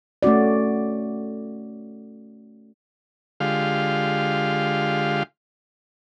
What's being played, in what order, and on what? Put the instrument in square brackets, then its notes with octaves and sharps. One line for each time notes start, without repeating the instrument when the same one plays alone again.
[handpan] A3 C#4 F#4 D5
[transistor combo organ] D3 G#3 F4 G4 F5